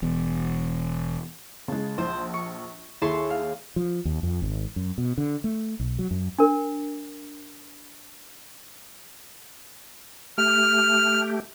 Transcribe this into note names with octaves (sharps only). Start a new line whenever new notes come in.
E1 E2
C#3 G#3 A5
A#1 C5
C#6
D#2 E4 G#4 A5 C6 C#6
F5
F3
D#2
F2
G#1
F#2
B2
D3
A3
B1
F#3
F#2
D4 A#4
A3 G4 F6